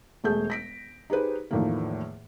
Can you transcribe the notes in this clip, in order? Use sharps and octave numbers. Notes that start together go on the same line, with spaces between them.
E1 A3 G#4 G6
A#6 B6 D7
D#4 G4 G#4 B4 C5
E2 A2 D#3 F3 A3 A#3